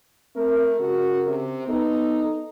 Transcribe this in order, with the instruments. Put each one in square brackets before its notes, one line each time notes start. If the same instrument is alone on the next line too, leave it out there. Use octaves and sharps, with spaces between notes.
[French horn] A3 [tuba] C4 [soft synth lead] A#4
[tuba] C#3 [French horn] F#4
[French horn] C3
[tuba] B3 [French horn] D#4 [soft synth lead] A4